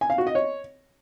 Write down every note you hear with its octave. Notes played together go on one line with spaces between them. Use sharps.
G#5
F5
F#4
D#5
C#5